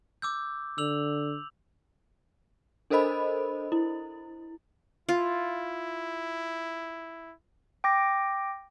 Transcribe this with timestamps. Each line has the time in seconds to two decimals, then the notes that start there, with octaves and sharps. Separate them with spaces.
0.22 D6 E6 G6
0.78 D3 E6 F7 F#7
2.90 D4 A4 A#4 C5 D#5 B5
3.72 E4
5.09 E4 F4
7.84 G5 D6 A#6